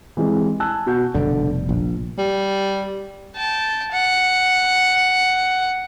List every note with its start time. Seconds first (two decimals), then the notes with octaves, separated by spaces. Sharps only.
0.17 E3 G3 G#3 C4
0.60 G#5 A5 E6 F#6
0.86 B2 F#4 G6
1.15 F1 B2 D3 G3
1.69 A#1
2.18 G3
3.36 G5 A5
3.92 F#5